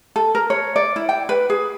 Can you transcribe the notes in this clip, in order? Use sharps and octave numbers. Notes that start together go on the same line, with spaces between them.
A4
A#4
C#5
D5
E4
G5
B4
G#4